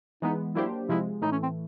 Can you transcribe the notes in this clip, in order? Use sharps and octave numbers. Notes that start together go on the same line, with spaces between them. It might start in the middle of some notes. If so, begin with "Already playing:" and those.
E3 G#3 B3 D#4
F#3 A#3 D4 E4 G4 C5
C3 F3 G#3 E4
A2 E3 A3 D#4
C#4
C4